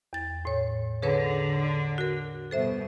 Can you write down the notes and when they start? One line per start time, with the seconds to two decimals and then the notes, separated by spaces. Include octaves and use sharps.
0.13 E2 A6
0.45 A2 C#5
1.02 D3 G#4 B4 C#5
1.98 F#4 A#4
2.51 G2 B2 A4 C5 E5